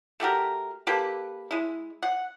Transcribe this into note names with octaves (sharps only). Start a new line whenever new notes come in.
A3 F#4 G4 A#4
A#3 G4 A4 B4
G#3 E4
F#5